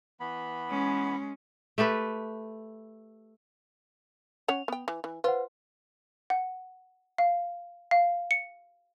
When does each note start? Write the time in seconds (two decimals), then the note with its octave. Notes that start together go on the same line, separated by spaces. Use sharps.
0.20 E3 B3 B5
0.69 G#3 C#4
1.78 A3 G4 A4 B4
4.48 C#4 C#5 F#5 F7
4.68 B3 G5
4.88 E3
5.04 E3
5.24 F4 B4 C5 F#5
6.30 F#5
7.18 F5
7.91 F5
8.31 C#7